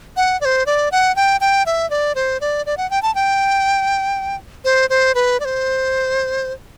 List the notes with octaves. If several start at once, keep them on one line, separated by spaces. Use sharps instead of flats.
F#5
D5
C5
D5
F#5
G5
G5
E5
D5
C5
D5
D5
F#5
G5
A5
G5
C5
C5
B4
D5
C5